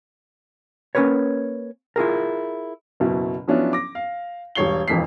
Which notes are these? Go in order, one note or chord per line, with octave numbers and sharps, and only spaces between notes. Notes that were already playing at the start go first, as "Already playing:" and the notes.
A#3 C#4 D#4 A#4 B4 C#5
E4 F4 G#4 A#4
F#1 B2 E4
F3 F#3 B3 C#4 D4 E4
D6 A#6
F5
E1 G3 C#5 C7 G7
E1 F2 E3 B6 C7